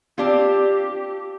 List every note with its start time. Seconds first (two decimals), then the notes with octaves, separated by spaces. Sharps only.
0.18 C4 D4 F4 G4